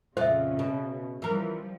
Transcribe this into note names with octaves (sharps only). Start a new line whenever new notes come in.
F2 A#2 C#3 F4 C5 E5
B2
E3 F3 G3 A#4